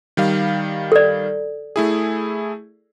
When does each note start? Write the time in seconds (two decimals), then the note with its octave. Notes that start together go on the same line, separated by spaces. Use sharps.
0.17 D#3 G3 F5
0.92 A4 D5
1.76 A3 E4 G#4